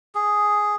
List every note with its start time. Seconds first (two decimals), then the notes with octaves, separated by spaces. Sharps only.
0.15 G#4